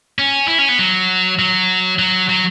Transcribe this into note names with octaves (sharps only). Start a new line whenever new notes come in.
C#4
E4
C#4
B3
F#3
F#3
F#3
F#3